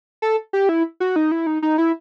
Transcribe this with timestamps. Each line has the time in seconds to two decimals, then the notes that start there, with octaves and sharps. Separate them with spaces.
0.22 A4
0.53 G4
0.69 E4
1.00 F#4
1.16 D#4
1.32 E4
1.47 D#4
1.62 D#4
1.78 E4